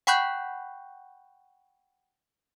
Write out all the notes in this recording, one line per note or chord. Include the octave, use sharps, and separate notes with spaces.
F#5 G5 B5 C#6 F#6 G6